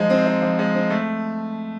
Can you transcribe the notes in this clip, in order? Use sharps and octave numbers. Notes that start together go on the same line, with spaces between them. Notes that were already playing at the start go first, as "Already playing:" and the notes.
Already playing: F3 G#3 D#4
C4
D#4
F3
G#3
C4
A3